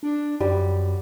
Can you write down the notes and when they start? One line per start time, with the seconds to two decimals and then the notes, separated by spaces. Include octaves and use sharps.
0.03 D4
0.40 F#2 G3